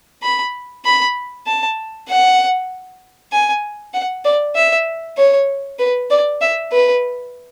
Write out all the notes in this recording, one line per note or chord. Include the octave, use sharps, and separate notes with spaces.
B5
B5
A5
F#5
G#5
F#5
D5
E5
C#5
B4
D5
E5
B4